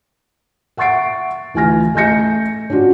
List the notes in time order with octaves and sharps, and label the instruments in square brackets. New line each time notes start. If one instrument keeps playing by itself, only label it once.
[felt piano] E5 F#5 C#6 A6 C7 D7
D2 E3 F4 G#5 F6 A#6
A3 D#5 G#5 G6 A#6 C#7
C#4 D4 F4 F#4